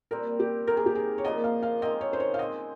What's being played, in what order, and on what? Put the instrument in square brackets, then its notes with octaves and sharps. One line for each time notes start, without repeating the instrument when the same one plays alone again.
[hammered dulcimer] A#2 G3 C4 [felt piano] A#4
[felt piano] G4
[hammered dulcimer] C3 D#3 A#3 [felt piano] A#4
[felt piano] G#4
G4
G#4
C#5
[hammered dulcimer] A#2 F3 A#3 [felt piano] D#5
[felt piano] F5
F5
[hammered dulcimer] D#3 G#3 C4 [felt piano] D#5
[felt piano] C#5
C5
C#5
F5
[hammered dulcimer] C#3 G#3 C4 [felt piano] D#5